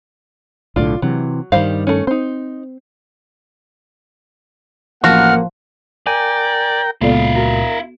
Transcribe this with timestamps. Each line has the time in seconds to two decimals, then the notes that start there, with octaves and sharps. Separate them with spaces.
0.76 B1 A2 D3 F4 D5
1.02 C3 E3 F#3
1.52 G2 D#3 G3 C5 F5
1.87 A3 C#4
2.07 C4 D#4 C5
5.04 A1 F3 A#3 F#4 F#5 F6
6.07 A#4 D5 G5 G#5
7.02 C#2 A#2 B3 E4 A4 D5 F5
7.36 F#4 A#4